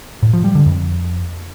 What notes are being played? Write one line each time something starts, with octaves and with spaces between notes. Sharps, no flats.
A2
F3
G3
D3
F2